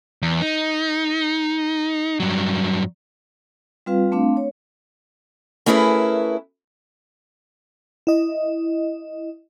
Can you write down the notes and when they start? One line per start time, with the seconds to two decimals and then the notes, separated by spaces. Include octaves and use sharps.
0.22 E2
0.42 D#4
2.20 G2 F#3
3.86 G3 C4 F4 B4 F5
4.12 A3 C4 D4 F5
4.37 C#5
5.66 A3 C#4 E4 G#4 A#4 B4
8.07 E4 D#5